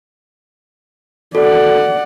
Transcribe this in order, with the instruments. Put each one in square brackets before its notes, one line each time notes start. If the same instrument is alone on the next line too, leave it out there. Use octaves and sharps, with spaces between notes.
[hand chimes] F#4 A4 [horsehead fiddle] D5 F#5